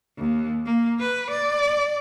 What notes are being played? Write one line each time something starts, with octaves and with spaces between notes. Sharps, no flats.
D#2
A#3
B4
D5